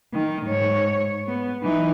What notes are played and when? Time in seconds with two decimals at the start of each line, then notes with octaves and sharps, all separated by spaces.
0.13 D#3
0.46 G#2 C#5
1.27 B3
1.62 E3 D#4